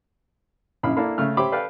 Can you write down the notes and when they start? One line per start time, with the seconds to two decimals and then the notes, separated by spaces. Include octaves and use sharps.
0.83 A#1 F#2 E4 F5 B5
0.96 A#3 D4 E4 A4 F5 B5
1.18 C#3 A3 F6
1.37 G4 C5 C#5 E5 B5 D6
1.52 A4 B4 D5 F5 G5